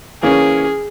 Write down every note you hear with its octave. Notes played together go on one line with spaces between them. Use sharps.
E3 A#3 C#4 G#4